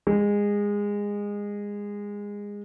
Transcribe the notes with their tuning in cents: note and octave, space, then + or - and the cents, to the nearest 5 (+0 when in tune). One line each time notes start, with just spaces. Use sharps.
G#3 -20